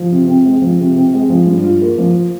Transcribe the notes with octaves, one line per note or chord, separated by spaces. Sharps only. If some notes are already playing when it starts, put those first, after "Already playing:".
Already playing: F3
C3
C4
G#3
F3
C3
C4
G#3
F3
G2
F4
A#3
F3